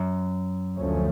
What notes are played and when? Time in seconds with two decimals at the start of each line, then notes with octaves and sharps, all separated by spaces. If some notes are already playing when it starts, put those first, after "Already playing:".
Already playing: F#2
0.78 D2 D3 F3 A3 C#4